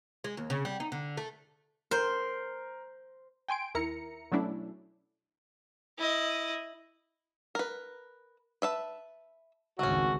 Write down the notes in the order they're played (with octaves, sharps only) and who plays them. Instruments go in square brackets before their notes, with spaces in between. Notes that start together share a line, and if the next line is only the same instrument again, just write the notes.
[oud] G#3
D#2
C#3
G3
D#4
D3
A3
[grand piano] A#4 [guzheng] C5
[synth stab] G5 G#5 C6 D7
D#2 E4 A#4 A#5 C#7
B2 F#3 A3 C#4 D4 E4
[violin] E4 D#5
[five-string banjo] A#4 B4
B4 E5 A5
[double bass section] G#1 C#2 D#3 [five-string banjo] A3 C#4 [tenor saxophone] F#4